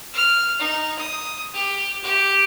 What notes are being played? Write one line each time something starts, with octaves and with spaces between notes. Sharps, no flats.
F6
D#4
D#6
G4
G4